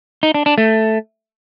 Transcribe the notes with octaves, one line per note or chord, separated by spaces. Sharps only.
D#4
D4
D4
A3